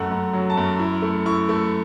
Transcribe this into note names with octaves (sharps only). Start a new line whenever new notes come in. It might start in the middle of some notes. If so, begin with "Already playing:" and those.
Already playing: F#2 A3 F#5
F#2
F#3
A5
F#2
E4
A3
E4 C#6
A3